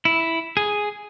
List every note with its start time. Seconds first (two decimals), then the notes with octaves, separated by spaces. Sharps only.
0.05 E4
0.57 G#4